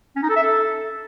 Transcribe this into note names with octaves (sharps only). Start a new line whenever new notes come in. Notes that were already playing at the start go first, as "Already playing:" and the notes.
C#4
D#4
A4
E5
A4